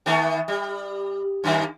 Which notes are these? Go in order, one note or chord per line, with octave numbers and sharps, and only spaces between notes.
D#3 A3 B3
G3
F#2 D#3 A#3